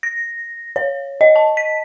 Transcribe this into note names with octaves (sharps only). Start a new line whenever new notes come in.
A#6
C#5
D#5
A5
B6